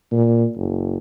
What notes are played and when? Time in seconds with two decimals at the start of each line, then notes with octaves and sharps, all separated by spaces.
0.12 A#2
0.57 F#1